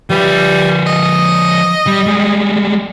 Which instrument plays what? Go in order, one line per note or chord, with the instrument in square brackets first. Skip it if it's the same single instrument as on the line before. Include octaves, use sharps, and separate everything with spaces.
[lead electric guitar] F3 B4 [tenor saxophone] G3
[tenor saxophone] D#5
[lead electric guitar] G3
G3 G#3